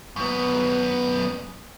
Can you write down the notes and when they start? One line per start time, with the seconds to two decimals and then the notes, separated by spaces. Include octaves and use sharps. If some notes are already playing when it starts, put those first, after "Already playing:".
0.16 F#2 B3